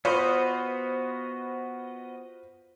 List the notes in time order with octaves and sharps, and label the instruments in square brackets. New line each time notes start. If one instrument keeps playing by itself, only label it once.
[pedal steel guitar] B3 F#4 D#5 [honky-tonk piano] F4 B4 C5